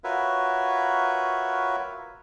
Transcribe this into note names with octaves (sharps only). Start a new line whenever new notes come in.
F4 F#4 A#4 B4 C#5 E5